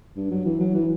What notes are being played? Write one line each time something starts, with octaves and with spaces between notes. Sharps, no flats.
G2
F#3
E3
F#3
E3